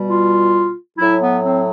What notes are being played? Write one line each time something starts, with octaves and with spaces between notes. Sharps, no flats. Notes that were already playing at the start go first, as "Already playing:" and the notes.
Already playing: B2 G3
F4
A2 F#3 E4
B3
C4